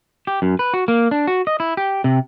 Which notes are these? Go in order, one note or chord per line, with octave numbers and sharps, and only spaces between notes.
G4
F#2
B4
F#4
A#3
D4
F#4
D#5
E4
G4
C3